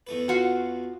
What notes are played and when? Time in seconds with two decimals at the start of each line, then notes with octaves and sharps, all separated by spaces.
0.07 E2 A3 B4
0.28 F4 F#4 F5